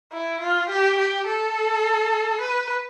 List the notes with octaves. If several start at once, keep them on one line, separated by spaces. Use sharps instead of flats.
E4
F4
G4
G4
A4
B4